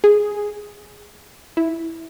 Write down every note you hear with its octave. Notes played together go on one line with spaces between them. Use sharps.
G#4
E4